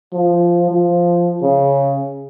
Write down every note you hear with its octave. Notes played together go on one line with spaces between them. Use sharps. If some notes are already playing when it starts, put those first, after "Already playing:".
F3
F3
C#3